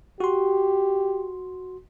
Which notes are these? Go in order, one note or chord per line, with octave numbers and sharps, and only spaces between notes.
F#4 G4 C6